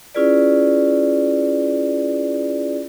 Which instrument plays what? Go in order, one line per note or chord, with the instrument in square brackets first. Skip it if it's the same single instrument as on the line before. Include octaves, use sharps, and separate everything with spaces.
[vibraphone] C#4 E4 F4 G#4 B4 D5